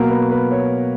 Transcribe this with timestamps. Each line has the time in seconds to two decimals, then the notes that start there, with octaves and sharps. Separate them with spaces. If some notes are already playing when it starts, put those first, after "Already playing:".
Already playing: B2 F#3 A#3 A#4
0.09 B4
0.31 B4
0.51 C#5